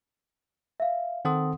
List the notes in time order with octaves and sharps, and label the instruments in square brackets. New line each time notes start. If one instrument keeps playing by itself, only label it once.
[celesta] E5 F5
[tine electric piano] D#3 C4 A4 [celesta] F#5 C6 D#6